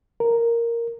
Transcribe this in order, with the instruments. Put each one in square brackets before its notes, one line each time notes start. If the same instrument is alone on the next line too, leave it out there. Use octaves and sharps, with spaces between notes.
[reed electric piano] A#4